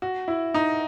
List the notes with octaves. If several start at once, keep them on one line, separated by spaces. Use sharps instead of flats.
F#4
E4
D#4